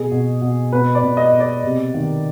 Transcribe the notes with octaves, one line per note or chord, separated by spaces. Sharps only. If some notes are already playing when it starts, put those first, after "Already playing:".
Already playing: B2 G#4
B2
B2
B2 B4
D5
B2
D#5
B2
D5
C3
D#3